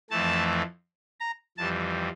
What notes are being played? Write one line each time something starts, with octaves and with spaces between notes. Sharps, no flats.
F2 E3 A3 A5
A#5
F2 E3 G3 A5